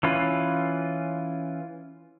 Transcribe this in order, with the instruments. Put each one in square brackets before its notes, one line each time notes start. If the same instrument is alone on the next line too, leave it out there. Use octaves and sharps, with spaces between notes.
[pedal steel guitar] E3 C#4 F4 B4